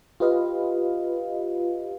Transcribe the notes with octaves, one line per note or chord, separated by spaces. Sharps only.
F4 G4 B4 D#5 F5